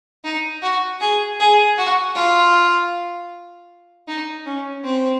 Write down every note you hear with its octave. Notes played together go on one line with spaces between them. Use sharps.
D#4
F#4
G#4
G#4
F#4
F4
D#4
C#4
C4